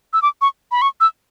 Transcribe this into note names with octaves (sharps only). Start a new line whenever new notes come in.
E6
D6
C#6
B5
C#6
E6